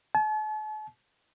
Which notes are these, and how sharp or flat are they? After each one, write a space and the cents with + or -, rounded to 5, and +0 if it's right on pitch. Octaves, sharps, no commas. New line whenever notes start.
A5 -40